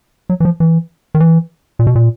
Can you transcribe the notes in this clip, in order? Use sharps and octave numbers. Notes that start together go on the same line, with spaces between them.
F#3
E3
F3
E3
D#3
E3
A#2
B2
A#2